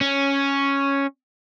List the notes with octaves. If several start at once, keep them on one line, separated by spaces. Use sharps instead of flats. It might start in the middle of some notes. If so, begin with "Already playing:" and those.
C#4